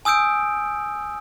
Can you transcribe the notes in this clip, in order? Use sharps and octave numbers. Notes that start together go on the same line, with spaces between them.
G#5 D#6 E6 G6 D7